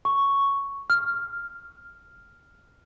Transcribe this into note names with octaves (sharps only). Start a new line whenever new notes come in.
C#6
F6